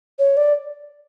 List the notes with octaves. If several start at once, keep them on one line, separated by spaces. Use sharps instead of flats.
C#5
D5